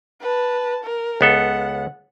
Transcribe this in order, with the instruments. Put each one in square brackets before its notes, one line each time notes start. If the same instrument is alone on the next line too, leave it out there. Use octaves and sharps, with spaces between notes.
[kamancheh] B4 A5
A#4
[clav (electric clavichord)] C#2 B3 A4 [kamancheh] F#5